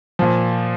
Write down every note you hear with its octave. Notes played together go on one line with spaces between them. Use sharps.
A#2 F3